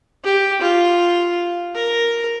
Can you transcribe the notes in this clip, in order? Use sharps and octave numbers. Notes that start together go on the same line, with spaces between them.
G4
F4
A#4